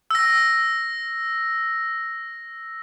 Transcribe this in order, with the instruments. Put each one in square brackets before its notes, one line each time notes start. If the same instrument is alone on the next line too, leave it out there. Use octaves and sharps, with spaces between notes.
[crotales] E6 A#6